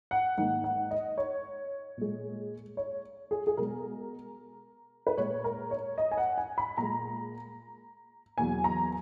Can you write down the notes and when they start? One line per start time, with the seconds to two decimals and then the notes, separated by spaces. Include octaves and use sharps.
0.11 F#5
0.38 G#2 D#3 A#3 F#5
0.64 F#5
0.91 D#5
1.18 C#5
1.97 A#2 G#3
2.77 C#5
3.31 G#4
3.47 G#4
3.57 B2 G#3 A#4
5.07 B4
5.18 A#2 G#3 C#5
5.44 A#4
5.71 C#5
5.98 D#5
6.12 G#5
6.18 F#5
6.38 G#5
6.58 B5
6.78 A#2 G#3 A#5
8.38 E2 B2 F#3 A#3 G#5
8.64 A#5